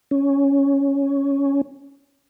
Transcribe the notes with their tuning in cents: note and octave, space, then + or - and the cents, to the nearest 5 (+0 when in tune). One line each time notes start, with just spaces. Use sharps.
C#4 +5